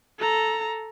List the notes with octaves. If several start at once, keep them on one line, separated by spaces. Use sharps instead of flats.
A4 A#5